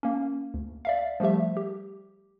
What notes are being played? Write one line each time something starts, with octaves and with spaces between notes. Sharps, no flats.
A#3 C#4
D2
D5 E5 F5
F3 G3 A3 G4 E5
G4